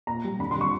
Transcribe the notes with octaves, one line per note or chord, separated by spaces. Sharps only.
A#2 A#5
G3
D3 B5
C6
G3
C#6